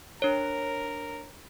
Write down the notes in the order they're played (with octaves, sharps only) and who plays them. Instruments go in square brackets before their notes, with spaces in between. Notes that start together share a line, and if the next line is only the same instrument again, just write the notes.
[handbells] D4 C#5 [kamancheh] A#4